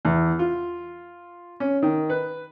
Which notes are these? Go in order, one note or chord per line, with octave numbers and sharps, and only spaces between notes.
E2
F4
C#4
D#3
B4